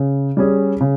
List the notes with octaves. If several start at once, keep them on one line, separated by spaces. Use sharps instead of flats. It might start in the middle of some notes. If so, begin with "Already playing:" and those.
Already playing: C#3
G3 C#4 G#4
C#3